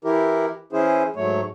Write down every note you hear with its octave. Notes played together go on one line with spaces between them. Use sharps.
E3 E4 G4 A#4
E3 C#4 E4 G#4 C5
G#2 F#3 A3 C#5